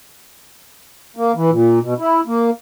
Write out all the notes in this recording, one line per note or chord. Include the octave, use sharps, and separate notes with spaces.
A#3
E3
A#2
B2
E4
A#3